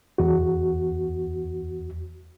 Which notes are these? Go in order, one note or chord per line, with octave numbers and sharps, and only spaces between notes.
E2 F#4